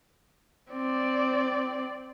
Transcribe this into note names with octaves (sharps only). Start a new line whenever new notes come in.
C4 D5